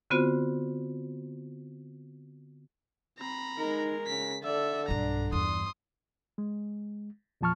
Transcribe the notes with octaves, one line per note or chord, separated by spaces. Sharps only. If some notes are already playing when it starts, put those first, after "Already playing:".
D3 B3 C4 F4 F#4 C5
C4 A#5 B5
G#3 D#4 A#4
C#3 B6
D3 A4 D5 E5
B1 G2 D4 A#5
E2 G2 C6 D#6
G#3
E2 A#2 F3 A5 C#6 F6